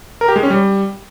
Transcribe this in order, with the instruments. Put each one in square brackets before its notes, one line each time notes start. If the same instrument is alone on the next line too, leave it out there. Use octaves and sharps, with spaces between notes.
[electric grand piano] A#4
G4
G#3
C#4
G3